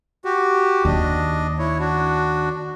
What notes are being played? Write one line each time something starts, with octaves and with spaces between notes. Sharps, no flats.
F#4 G4
D#2 D4 D#5
E4 C#5
D4 F#4